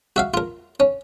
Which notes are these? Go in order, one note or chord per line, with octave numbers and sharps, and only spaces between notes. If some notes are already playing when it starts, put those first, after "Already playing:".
F#4 E5 F5
F4 A#4
C#4